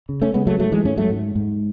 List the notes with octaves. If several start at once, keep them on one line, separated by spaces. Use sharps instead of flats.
C#3
A3 C#4
C#3 G#3 B3
F#3 A3
G#2 F#3 A3
E3 G#3
G#2 A3 C#4
F#3 A3
G#2
G#2